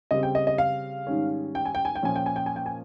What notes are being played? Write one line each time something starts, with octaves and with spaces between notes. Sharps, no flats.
C#3 G3 C4 D#5
G5
D#5
D#5
F5
G#2 D#3 G3 C#4
G5
G#5
G5
G#5
G5
A#2 F3 A#3 C#4 G#5
G5
G#5
G5
G#5
G5
G#5